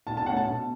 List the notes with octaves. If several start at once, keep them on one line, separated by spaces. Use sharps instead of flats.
B2 A5
A5
A3 C#4 F#5
A5
B2